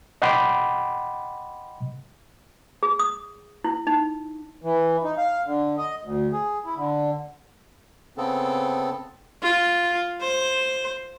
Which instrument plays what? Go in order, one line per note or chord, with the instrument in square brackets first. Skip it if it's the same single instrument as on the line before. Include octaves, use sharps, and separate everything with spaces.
[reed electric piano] D#5 F#5 G5 B5 C6 D6
[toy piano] G#4
D#6
E4
D#4
[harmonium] E3
D#4
F5
D3
D#5
D2
G#4
E4
D3
[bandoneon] C#3 B3 C4 A4
[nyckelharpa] F4
C5